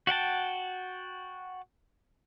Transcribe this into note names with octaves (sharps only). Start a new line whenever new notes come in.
F#4 F#5 G5 A5